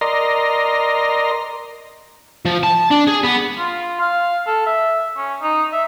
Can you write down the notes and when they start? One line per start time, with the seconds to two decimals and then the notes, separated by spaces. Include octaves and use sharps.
0.01 A#4 D5 D#5 A#5 C6
2.46 F3
2.63 A5
2.91 D4
3.07 G#4
3.23 B3
3.59 F4
4.01 F5
4.47 A4
4.66 E5
5.17 C#4
5.42 D#4
5.73 E5